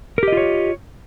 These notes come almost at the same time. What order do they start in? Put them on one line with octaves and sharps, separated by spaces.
A#4 G4 D#5 F4 C#5